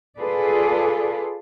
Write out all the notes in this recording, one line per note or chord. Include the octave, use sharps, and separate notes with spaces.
F4 G#4 A4 B4 D5